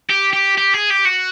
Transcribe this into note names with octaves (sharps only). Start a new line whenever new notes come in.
G4
G4
G4
G#4
G4
F#4